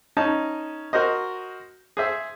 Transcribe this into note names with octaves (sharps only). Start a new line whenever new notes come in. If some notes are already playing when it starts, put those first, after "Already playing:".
C#4 D#4 A5
F#4 A#4 C5 D#5
G#4 C5 E5